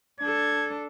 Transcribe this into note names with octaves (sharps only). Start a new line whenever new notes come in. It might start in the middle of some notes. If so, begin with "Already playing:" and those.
D4 A4 G#6